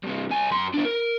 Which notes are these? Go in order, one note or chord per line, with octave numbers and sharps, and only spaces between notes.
G2 C3
C2 G#5
F#2 C6
B3 D4
A#4